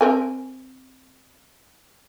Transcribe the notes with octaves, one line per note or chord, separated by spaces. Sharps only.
C4 A#4 G#5